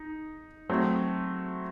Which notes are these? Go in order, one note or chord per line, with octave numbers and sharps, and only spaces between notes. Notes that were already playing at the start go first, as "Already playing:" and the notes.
Already playing: D#4
F#3 A3 C4